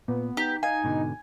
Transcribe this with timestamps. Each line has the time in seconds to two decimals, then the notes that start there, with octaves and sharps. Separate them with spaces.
0.08 A#2 B3
0.37 D#4 G4
0.63 D#4 F5 G#5
0.84 G#2 B2 D3